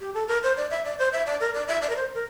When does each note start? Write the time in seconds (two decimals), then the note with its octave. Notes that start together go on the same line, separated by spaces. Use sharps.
0.01 G4
0.14 A4
0.28 A#4
0.43 C5
0.57 D5
0.71 E5
0.85 D5
0.99 C5
1.13 E5
1.27 D5
1.40 A#4
1.54 D5
1.68 E5
1.82 D5
1.90 A#4
1.96 C5
2.15 A#4